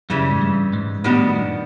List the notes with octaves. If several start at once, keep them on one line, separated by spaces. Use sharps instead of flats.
F#2 C#3 E3 G3
G#2
G2
G#2
A2 D#3 G3 B3 D4 F#4
F#2